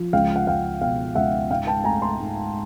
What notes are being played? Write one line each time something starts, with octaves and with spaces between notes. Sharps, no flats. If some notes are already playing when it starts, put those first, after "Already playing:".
Already playing: F3
C#2 F5 G5
F#5
C#2 F5 G5
B2 F5 G5
C#2 E5 F#5
G#2 F5 G5
G5 A5
A3 G#5 A#5
A#5 C6
G#2